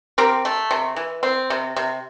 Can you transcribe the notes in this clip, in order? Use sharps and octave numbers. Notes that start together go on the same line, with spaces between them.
C4 G4 A#4
A3
C3
E3
C4
C3
C3